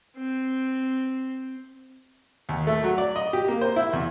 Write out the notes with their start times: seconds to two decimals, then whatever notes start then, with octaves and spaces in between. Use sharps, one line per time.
0.18 C4
2.49 D#2
2.67 A3
2.84 F#3
2.98 D5
3.16 D#5
3.33 G4
3.48 A#3
3.61 C5
3.76 E4
3.93 E2